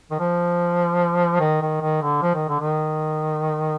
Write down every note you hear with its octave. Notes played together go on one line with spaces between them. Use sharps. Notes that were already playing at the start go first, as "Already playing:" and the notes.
D#3
F3
D#3
D#3
D#3
D3
F3
D#3
D3
D#3